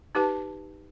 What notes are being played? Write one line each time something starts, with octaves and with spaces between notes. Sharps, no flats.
D#4 G4 B4 A5